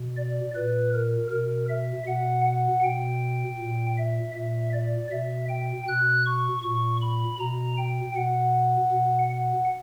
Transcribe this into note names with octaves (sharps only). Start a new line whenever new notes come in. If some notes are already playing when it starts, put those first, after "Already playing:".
Already playing: B2
D5
A#2 B4
A#4
B2 A#4
E5
B2 F#5
F#5
B2 G5
A#2
E5
A#2 E5
D5
B2 E5
G5
B2 F#6
C#6
A#2 C#6
B5
B2 A#5
G5
B2 F#5
B2
F#5